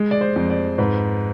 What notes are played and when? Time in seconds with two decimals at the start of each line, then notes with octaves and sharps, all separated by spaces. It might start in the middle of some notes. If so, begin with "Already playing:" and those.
Already playing: G#3
0.11 D5
0.21 C5
0.36 F2
0.50 D5
0.78 G#2 B4